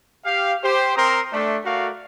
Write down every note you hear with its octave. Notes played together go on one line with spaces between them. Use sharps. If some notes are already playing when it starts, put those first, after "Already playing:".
G4 F5
G4 C5
C4 A#4 A#5 C6 D#6
A3 D4
A3 F#4 A#4 D5 F5